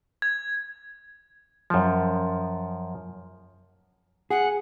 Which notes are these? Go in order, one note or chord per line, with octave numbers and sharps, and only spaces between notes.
G#6
F#2 F3
G#4 F#5